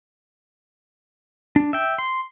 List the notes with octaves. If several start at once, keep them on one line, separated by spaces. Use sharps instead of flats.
D4
E5 G5
C6